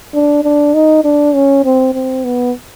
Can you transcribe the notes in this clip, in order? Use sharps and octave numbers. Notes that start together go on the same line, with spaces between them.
D4
D4
D#4
D4
C#4
C4
C4
B3